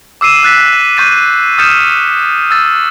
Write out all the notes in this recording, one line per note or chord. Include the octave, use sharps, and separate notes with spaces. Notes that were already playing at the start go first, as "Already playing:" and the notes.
D6 E6 C7 D#7 E7
E6 F#6 A6 B6
C#6 G6 A6 D#7
D#6 F6 G6 A6 C#7 E7
E6 A6